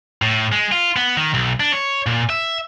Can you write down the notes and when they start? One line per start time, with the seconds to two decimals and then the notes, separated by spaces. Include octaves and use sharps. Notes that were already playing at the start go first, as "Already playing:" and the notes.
0.22 A2
0.52 G#3
0.72 F4
0.96 B3
1.17 D#3
1.34 B1
1.60 D4
1.72 C#5
2.06 A#2
2.30 E5